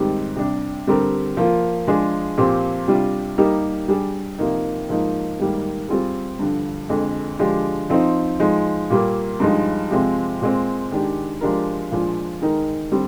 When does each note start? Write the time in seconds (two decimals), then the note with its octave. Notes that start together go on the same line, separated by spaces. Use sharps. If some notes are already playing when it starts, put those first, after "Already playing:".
Already playing: G#2 D#3 G3 C4 G4
0.36 C3 G3 D4
0.87 D3 G3 C4 G4 A#4
1.37 F3 A#3 F4
1.87 F3 G#3 D4 G#4
2.37 A#2 F3 C4 G4
2.88 C3 G3 D4 F4
3.38 G3 A#3 D#4 G4 A#4
3.88 G3 D4 G#4
4.38 C3 F3 A#3 D#4
4.89 G#2 F3 A#3 D#4
5.39 G#2 D#3 G3 A#3
5.89 G3 C4 F4 G#4
6.39 G2 D3 F3
6.89 F2 D3 G#3
7.39 D3 F3 G#3 D4 G4
7.90 F3 C4 D#4
8.40 F3 G#3 D#4
8.90 A#2 G3 A#3
9.40 G2 F3 G#3 D#4
9.91 C3 F3 G#3 C4
10.41 A#2 G#3 C4
10.92 D#3 G#3 D4 G4
11.41 F3 G#3 D4 G4 A#4
11.91 A#2 F3 G#3 D4 F4
12.42 D#3 G#3 D#4 A#4
12.92 D3 G3 C4